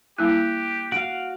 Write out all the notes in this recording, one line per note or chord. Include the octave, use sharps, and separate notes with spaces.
G3 A#3 E4 G4 F#6
F#4 F5 D7